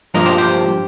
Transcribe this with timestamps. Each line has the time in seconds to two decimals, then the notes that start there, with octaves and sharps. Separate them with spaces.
0.14 G2 F3 A#3 A#4 D#5
0.26 G4 C5
0.38 G4 C5